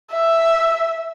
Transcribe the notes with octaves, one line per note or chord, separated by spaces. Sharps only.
E5